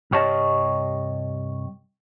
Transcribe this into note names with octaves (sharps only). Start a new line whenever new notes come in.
C2 G2 G4 C#5 D#5 A5